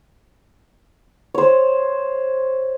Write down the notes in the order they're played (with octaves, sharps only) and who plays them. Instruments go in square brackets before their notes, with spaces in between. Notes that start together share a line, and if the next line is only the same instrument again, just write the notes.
[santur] C5 C#5